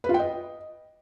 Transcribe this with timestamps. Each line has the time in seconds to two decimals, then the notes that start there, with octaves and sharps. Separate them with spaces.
0.04 B4
0.09 F4
0.14 G5
0.19 D#5